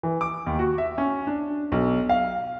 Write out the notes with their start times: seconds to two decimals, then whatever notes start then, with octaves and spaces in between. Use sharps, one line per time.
0.03 E3
0.21 D6
0.46 D#2
0.59 F#4
0.78 E5
0.98 C#4
1.27 D4
1.72 B1
2.09 F5